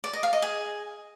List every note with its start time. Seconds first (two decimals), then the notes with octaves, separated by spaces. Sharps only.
0.04 D5
0.13 D#5
0.23 F5
0.33 D#5
0.42 G#4